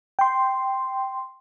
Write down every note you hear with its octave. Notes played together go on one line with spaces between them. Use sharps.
G5 C6